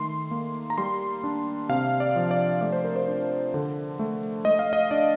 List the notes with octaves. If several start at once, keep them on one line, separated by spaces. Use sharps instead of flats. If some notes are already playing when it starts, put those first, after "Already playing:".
Already playing: D#3 A3 C6
A#3
A#5
G3 C6
D4
C3 F5
D5
F3
D5
A3 D5
C5
A#4
C5
D4
D3
A3
A3 D#5
F5
D#5
D4 D5